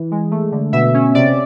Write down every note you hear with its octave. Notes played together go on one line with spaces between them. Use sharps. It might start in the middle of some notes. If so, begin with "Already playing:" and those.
Already playing: E3
G#3
A3
D3
B2 E5
C#4
C3 D5